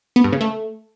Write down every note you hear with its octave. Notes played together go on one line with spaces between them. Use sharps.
B3
G2
C#3
A3